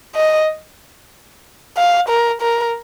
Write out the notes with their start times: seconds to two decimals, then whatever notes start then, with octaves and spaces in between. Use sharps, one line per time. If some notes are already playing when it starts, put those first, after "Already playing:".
0.15 D#5
1.77 F5
2.09 A#4
2.41 A#4